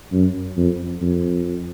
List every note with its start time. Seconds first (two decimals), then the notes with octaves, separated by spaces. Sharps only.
0.13 F#2
0.57 F2
1.02 F2